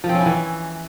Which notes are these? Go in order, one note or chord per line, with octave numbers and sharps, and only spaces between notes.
F3
C4
C#4
E4
E3